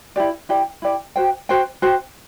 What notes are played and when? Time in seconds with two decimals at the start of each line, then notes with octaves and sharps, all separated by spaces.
0.16 E4 G4 D5
0.49 E4 G4 D5
0.82 E4 G4 D5
1.16 F#4 C5 G5
1.49 F#4 C5 G5
1.82 F#4 C5 G5